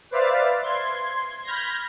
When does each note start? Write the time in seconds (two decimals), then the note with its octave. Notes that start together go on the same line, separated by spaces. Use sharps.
0.11 B4 C5 D5 E5 F5 A6
0.63 C6 G#6
1.45 B5 F6 G6 G#6 A#6